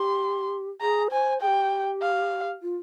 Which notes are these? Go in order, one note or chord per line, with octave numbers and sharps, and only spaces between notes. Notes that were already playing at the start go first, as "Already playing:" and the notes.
Already playing: G4 C6
G#4 A#5
C5 G#5
G#4 G5
G4
F5
F4